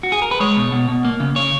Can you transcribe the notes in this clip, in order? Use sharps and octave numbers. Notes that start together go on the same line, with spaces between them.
F#4
G#4
A#4
B4
G#3 C#5
B2
B2
B2
A#3
C#3
C#3 C#5